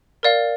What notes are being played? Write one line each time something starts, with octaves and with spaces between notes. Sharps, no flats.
A#4 D5 F5